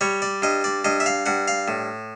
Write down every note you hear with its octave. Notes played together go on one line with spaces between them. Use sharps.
G3 C#5
D5
G2 D#5
D5
G2 D#5
E5
F5
G2 F#5
F5
A2